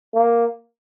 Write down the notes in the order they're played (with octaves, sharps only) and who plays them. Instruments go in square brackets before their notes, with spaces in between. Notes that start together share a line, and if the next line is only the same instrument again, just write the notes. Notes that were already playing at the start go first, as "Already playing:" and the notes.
[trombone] A#3